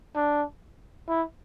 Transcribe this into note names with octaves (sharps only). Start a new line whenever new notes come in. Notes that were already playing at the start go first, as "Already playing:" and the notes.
D4
E4